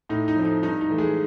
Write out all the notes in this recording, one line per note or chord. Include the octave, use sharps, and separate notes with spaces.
A2 D#4
D#4
F3 A3 C4
D#4
G2 D#4
D#4
E3 A3
G#3 G#4